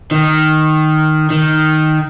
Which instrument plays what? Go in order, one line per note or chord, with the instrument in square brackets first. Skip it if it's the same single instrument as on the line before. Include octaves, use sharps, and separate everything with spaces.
[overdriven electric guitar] D#3
D#3